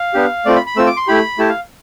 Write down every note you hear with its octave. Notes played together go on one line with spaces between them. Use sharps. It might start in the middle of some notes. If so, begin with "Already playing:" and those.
Already playing: F5
B3 D4 G4
A3 C4 F4 D5
B5
B5
A3 C4 F4 E6
D6
C6
A3 E4 G4 B5
A3 E4 G4 A5
F5